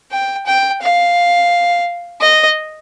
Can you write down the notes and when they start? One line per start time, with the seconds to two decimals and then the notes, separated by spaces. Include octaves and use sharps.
0.12 G5
0.46 G5
0.82 F5
2.21 D#5